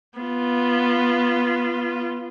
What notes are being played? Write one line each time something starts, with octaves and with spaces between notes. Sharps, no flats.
B3 F4